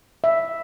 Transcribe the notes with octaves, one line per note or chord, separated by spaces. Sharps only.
E5